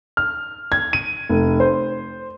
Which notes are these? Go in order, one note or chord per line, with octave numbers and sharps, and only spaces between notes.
F6
G#6
D#7
F1
C5